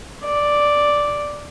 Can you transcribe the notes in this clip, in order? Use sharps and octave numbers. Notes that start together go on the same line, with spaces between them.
D5